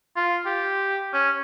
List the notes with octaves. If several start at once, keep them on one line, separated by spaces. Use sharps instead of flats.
F4
G4
C#4